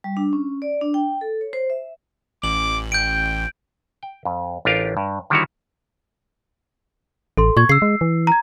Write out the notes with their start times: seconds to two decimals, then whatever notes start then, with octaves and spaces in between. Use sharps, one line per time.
0.04 G3
0.17 D4
0.33 C#4
0.62 D5
0.81 D4
0.94 G5
1.21 A4
1.41 C#5
1.53 C5
1.70 E5
2.43 A1 D6 F#7
2.92 G5 G6 D7
4.03 G5
4.25 F2
4.65 A1 D4 F4 G4 A#4 F5
4.97 G2
5.30 D3 D#3 G3 E4 F#4 C#5
7.37 A1 A4 C6
7.57 A#2 C#6 G#6
7.69 C#3 E6 C7
7.82 G#3
8.01 E3
8.27 A#5 G#6